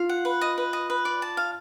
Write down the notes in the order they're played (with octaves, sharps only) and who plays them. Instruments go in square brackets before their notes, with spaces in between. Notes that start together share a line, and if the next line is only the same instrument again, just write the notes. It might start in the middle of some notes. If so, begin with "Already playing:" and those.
Already playing: [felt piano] F4 [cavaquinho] F5
[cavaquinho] F#5
B4
D#5
B4
D#5
B4
D5
A5
F5